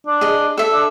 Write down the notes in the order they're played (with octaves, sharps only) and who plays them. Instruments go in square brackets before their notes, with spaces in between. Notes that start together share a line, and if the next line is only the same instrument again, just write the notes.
[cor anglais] D4
[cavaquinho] G#4 D#5
A4 E5
[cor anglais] D4